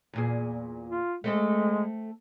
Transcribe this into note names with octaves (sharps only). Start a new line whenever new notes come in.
E2 A#2 G#4
F4
G#3 A3 C4 A4